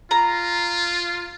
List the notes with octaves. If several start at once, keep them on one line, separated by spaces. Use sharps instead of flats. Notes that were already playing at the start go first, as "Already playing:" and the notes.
F4 A#5